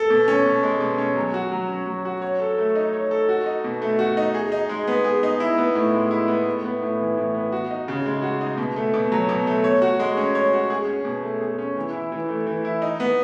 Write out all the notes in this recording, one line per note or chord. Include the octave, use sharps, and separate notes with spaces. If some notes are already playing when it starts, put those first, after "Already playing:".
Already playing: A4
B2
C#4
B2
G#3
B2
C#4
F#3
F#4
F#3
C#4
F#3
F#4
C#5
A4
A3
D#4
C#5
A4
F#4
D#4
B2
A3
F#4
D#4
G#4
D#4
G#3
B3
G#4
D#4
E4
B3
A2
G#3
E4
B3
A2
B3
A2
E3
A2
B3
F#4
D#4
C#3
G#3
F#4
D#4
B2
A3
B2
F#3
B2
A3
C#5
F#4
G#3
C#4
C#5
F#4
G#4
C#4
B2
A3
G#4
C#4
E3
E4
E3
A3
E3
E4
D#4
B3